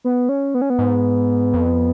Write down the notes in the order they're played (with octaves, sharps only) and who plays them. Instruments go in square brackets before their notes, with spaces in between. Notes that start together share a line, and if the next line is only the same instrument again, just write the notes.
[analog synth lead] B3
C#4
B3
C#4
B3
[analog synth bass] G#2
F2